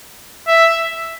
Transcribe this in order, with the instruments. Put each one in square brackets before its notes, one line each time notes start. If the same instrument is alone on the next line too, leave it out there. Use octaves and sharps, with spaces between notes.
[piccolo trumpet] E5